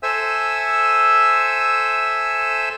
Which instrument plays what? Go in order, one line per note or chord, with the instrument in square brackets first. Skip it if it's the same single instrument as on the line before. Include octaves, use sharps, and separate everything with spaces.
[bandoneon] A4 C5 E5 G#5 E6